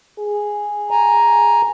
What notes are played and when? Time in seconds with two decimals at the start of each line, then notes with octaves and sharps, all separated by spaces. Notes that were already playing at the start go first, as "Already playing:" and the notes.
0.19 G#4
0.91 G#5 A#5